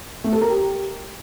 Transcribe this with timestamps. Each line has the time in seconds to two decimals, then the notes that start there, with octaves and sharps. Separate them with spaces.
0.24 A3
0.33 A4
0.41 A#4
0.50 G4